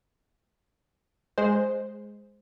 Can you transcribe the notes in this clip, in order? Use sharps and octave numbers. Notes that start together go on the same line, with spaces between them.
G#3 C5